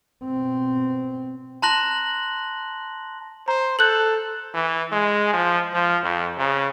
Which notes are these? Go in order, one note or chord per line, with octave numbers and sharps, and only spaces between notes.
B2 C4
A5 A#5 C6 F#6 A#6 F#7
C5 A#5
A4 F#6 G6 F#7
E3
G#3
F3
F3
F2
C#3